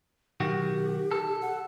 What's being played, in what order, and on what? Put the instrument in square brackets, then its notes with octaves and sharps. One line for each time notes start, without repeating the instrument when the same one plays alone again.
[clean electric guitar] B1 D#3 F#4 [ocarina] G4
[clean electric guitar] A4
[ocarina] F#5